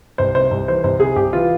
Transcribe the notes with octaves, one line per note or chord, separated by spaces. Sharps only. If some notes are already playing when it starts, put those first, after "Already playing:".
C2 C5
C3 C5
C2
E3 C5
C2 C5
C3 G#4
C2 G4
E3 F4